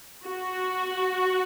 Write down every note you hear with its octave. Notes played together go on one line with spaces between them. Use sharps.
F#4